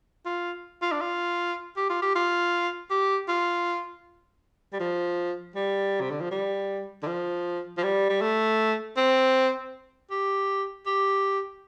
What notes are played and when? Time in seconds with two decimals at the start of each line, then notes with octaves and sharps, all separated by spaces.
0.25 F4
0.82 F4
0.92 D4
1.01 F4
1.77 G4
1.90 F4
2.02 G4
2.15 F4
2.90 G4
3.28 F4
4.73 G3
4.80 F3
5.56 G3
6.01 C3
6.11 D3
6.21 F3
6.31 G3
7.03 D3
7.07 F3
7.77 F3
7.83 G3
8.10 G3
8.21 A3
8.97 C4
10.10 G4
10.86 G4